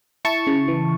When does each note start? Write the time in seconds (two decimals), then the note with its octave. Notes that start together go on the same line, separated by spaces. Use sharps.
0.25 E4 A5 C#6
0.47 C#3
0.68 E3